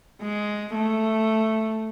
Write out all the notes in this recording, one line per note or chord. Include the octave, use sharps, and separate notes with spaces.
G#3
A3